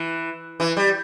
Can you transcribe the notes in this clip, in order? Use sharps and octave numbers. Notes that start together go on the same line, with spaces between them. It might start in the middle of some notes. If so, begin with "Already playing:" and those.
Already playing: E3
E3
G3